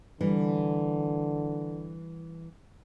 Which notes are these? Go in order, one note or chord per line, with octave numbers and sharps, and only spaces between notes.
D3 E3 G3